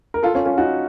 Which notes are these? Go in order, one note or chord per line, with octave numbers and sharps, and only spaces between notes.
A#4
F4 A4
C#4 F4
C#4 F4
D#4 F#4